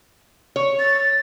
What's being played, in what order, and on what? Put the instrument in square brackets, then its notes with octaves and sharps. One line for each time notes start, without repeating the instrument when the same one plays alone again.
[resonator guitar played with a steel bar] C#5
[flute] A6